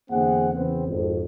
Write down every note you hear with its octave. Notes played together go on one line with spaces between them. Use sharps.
E2 D3 A#3 C4 G#4 F#5
E2 C#3 E3 B3 C4
G#1 F2